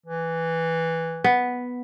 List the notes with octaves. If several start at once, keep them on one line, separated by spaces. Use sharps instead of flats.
E3
B3